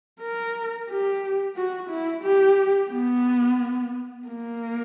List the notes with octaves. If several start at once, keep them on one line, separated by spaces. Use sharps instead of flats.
A#4
G4
F#4
E4
G4
B3
A#3